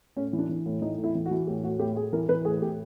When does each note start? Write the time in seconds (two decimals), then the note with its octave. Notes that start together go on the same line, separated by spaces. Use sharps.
0.17 A2 C#4
0.33 E3
0.39 D4
0.49 E3
0.66 A2
0.82 E3 D#4
0.98 A2
1.04 E4
1.15 E3
1.26 F#4
1.31 E3
1.47 A2 G4
1.64 A2 F#4
1.79 A2 G4
1.96 A2 G#4
2.13 E3 A#4
2.29 E3 B4
2.45 A2 G#4
2.61 A2 G4